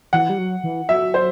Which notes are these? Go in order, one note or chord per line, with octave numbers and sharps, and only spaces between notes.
E3 F#5
G3
F#3
E3
F#3 E5
C5